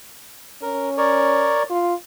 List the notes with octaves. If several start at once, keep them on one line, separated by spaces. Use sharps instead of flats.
C#4 A#4
A#4 C#5 D5
F4